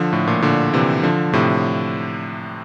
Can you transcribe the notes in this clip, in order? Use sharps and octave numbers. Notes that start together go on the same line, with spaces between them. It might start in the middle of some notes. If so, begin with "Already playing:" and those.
Already playing: D3 F3
A2
A#2
A#2 D3
C3 E3
D3 F3
A2 C3